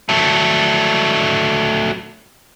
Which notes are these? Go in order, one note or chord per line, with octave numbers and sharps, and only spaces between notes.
F#3 A3